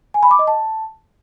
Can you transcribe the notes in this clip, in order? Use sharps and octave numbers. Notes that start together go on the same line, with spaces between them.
G#5
B5
D6
D#5
A5